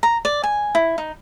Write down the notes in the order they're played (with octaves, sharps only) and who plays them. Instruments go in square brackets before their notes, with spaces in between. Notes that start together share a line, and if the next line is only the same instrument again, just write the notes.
[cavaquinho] A#5
D5
G#5
E4
D#4